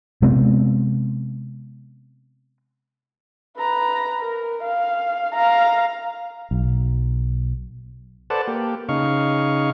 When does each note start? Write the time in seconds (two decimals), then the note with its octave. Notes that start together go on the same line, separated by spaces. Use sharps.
0.22 C3 G#3 B3 C4
3.58 B4 A#5
4.22 A#4
4.63 F5
5.35 F5 A#5
6.51 B1
8.30 A4 B4 C5 D5 F#5 A5
8.47 A#3 G4
8.89 C#3 D#4 F5 C#6